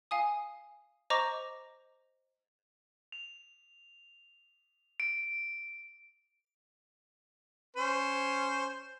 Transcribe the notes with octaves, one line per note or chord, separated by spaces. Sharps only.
F5 G#5 D#6
C5 D#5 A#5 C#6 D6 A#6
F7
D7
C#4 C5